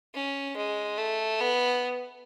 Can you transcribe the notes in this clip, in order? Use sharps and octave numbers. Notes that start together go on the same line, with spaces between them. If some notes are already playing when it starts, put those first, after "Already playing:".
C#4
G#3
A3
B3